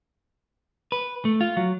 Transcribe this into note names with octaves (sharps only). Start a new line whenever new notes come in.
B4
A3
F4
F#3